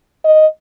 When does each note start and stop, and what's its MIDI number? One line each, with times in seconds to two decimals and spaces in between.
0.25 0.47 75